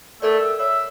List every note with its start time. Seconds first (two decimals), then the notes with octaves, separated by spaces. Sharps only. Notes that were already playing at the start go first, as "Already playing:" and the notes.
0.22 A3 A4 A#4 D5
0.39 E5
0.59 C#5 E5